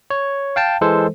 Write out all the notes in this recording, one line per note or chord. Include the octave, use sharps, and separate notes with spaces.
C#5
F5 G5 A5
E3 G#3 A4 C5